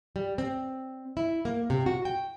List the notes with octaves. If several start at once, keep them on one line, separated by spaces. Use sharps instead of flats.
G3
C4
E4
A#3
C3
F#4
G5